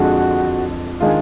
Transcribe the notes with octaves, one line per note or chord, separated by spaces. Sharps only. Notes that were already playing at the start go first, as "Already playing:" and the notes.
Already playing: F2 D3 G#3 D4 F#4 G#4
D#3 G#3 D4 F4 G#4